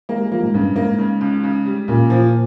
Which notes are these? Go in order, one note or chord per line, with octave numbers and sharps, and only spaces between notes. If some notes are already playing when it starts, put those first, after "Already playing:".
G#3 A#3
G3
F3 A#3
G#2
G2 C#3
G#2 A#3
C#3
C#2
C#3
G3
A#2 C#3
F3